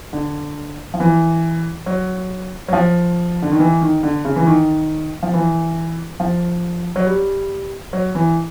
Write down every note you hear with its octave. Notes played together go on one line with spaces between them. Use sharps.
D3
F3
E3
F#3
F#3
F3
D3
D#3
E3
D#3
D3
C#3
E3
D#3
F3
E3
F3
F#3
G3
F#3
E3